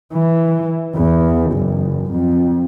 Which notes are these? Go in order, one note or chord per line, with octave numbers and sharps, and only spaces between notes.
E3
E2
F#1
F2